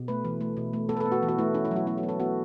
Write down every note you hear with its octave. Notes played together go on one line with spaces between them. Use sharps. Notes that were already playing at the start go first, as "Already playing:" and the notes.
Already playing: B2
A3 B4
E3
A3
B2
A3
B3 A4
B4
A4
B3
F#4
E3
F#4
A3 E4
C#4 E4
E4
F#3 F#4
B3 E4
F#4
B3
A4
B3 F#4